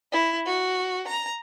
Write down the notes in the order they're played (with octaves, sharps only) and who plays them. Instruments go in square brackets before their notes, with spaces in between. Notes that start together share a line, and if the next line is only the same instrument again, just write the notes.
[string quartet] E4
F#4
A#5